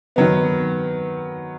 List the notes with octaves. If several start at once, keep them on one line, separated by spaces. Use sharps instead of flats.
D#3 F#3 B3